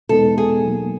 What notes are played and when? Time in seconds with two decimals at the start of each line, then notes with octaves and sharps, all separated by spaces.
0.09 E2 B2 G#3 B3 D#4 A4
0.38 G#4
0.64 B2 F#3 A#3